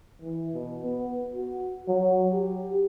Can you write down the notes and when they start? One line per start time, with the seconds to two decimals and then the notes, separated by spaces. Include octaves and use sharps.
0.21 E3
0.54 B2
0.83 B3
1.35 F#4
1.88 F#3
2.33 G4